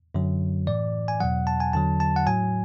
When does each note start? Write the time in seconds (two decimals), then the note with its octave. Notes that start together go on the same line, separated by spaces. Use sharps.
0.15 F#2 D3 F#3
0.67 A2 E3 D5
1.08 G#5
1.20 E2 B2 F#3 F#5
1.47 A5
1.60 G#5
1.73 E2 D3 F#3 A5
2.00 A5
2.16 F#5
2.26 A2 F#3 G#5